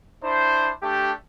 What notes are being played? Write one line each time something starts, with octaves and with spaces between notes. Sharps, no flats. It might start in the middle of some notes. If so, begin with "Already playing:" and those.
D4 E4 C5
A3 D4 G4